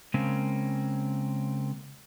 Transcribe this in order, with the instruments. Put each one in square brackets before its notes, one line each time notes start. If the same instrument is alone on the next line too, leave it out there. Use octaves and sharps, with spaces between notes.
[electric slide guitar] C#3 G#3 A#3 C4 C#4